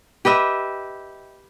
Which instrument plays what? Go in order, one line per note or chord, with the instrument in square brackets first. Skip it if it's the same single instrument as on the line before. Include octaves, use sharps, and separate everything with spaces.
[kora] G4 B4 D#5 E5